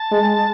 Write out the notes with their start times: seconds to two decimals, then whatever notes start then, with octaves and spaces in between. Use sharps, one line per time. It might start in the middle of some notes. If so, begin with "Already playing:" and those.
Already playing: A5
0.11 G#3